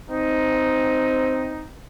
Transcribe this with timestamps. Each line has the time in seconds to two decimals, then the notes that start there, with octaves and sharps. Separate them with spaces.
0.10 C4 D#4